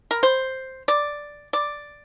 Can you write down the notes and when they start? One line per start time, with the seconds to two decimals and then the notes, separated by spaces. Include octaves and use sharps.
0.11 A#4
0.23 C5
0.88 D5
1.53 D5